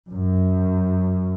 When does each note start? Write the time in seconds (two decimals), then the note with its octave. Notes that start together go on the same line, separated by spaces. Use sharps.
0.11 F#2